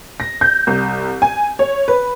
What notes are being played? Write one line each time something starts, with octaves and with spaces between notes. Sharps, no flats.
A#6
G6
C2
G#5
C#5
B4